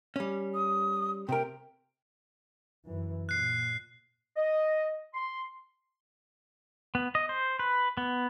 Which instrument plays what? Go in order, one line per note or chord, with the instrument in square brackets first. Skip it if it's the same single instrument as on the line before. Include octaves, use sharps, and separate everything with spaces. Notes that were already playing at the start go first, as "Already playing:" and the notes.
[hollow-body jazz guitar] G3 C#4
[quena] D#6
[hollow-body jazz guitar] C3 A#4 [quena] G5
[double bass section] F#2 E3
[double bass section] A#2 [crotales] F#6 C7
[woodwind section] D#5
C6
[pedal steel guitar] B3
D#5
C5
B4
B3